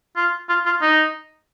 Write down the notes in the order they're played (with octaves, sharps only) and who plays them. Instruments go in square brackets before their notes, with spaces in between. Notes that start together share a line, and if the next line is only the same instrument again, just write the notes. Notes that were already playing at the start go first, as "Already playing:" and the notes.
[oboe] F4
F4
F4
D#4